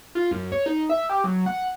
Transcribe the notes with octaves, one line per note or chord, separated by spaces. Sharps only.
F4
F#2
C#5
D#4
E5
G4
F#3
F#5